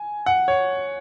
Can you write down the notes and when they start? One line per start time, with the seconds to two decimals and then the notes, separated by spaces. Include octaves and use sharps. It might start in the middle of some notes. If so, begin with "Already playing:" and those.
Already playing: G#5
0.26 F#5
0.48 C#5